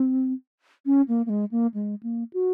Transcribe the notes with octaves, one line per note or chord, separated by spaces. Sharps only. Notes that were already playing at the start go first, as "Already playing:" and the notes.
Already playing: C4
C#4
A#3
A#3
G#3
A#3
G#3
A#3
F#4